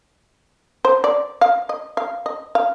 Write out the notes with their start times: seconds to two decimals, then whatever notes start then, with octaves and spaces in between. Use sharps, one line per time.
0.85 C5
1.04 D5
1.41 F5
1.69 D#5
1.97 F5
2.26 D#5
2.55 F5